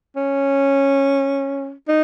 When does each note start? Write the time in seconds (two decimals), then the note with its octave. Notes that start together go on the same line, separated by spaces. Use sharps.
0.16 C#4
1.89 D#4